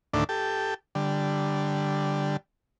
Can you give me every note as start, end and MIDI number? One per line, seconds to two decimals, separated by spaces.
0.13 0.24 38
0.13 0.24 45
0.13 0.24 51
0.13 0.24 57
0.13 0.24 62
0.13 0.24 74
0.29 0.74 67
0.29 0.74 69
0.95 2.37 50
0.95 2.37 55